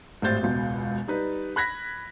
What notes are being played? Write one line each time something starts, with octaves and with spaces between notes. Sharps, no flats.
G#1 A2 G3 C5 G6 A6
E1 C#2 B2
G3 D#4 B4
B5 F#6 G#6 A#6 B6